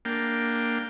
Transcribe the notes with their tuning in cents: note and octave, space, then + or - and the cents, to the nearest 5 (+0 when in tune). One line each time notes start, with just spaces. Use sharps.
A#3 +0 D4 +0 G5 +0